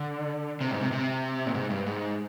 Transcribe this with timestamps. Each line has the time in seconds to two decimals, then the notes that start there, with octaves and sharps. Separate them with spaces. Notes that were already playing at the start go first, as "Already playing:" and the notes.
Already playing: D3
0.61 C3
0.71 G#2
0.81 C3
0.92 C3
1.46 A#2
1.54 G#2
1.70 G2
1.86 G#2